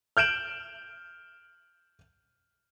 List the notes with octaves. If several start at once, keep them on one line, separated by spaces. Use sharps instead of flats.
F6 G6 D7 E7 F#7